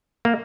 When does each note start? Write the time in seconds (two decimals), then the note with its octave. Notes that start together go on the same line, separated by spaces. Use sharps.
0.25 A#3